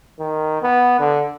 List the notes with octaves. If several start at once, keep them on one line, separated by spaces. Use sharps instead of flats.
D#3
B3
D3